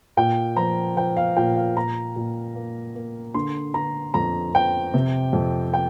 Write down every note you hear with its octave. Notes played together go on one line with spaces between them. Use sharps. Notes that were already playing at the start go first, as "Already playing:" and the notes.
A#2 G5
F3 A#5
F3 G5
F5
A#2 G5
F5
A#2 A#5
A#2
A#3
A#3
D3 C6
D3 A#5
F2 A#5
F3 G5
C3
F2
G5